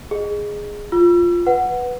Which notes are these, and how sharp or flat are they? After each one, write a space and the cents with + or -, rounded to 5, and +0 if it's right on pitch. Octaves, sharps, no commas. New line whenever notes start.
G#4 -5 D#5 -20
F4 +0 E6 +35
B4 +0 F#5 +0